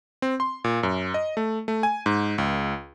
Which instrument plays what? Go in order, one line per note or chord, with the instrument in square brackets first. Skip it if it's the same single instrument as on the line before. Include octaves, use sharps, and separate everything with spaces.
[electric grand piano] C4
C6
A#2
F#2
D#5
A3
A3
G#5
G#2
C#2